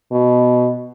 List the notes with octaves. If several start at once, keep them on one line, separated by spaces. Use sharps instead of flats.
B2